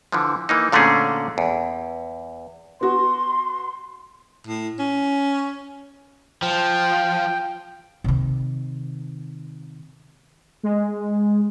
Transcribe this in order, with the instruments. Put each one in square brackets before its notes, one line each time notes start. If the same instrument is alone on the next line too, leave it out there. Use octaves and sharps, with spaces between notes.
[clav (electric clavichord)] D3 E3 F3
E3 A#3 D#4
A#2 D3 A3 C4 C#4 G#4
E2
[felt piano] B3 F#4 [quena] C6
[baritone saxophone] A2
C#4
[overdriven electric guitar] F3 [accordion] G5
[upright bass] C3 D#3
[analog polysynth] G#3